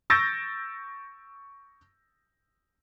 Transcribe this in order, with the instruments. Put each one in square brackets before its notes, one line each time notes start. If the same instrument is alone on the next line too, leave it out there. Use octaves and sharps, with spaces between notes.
[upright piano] C#6 E6 G6 A6 A#6 D7